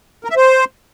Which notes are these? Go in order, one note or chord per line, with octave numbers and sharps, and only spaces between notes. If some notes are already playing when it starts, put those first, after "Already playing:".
A#4
E5
C5